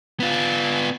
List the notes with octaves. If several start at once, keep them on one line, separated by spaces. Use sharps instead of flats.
B3 F4